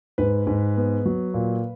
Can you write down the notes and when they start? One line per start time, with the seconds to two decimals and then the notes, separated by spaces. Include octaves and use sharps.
0.18 G#2 B4
0.47 G#2
0.77 B3
1.06 F#3
1.34 A#2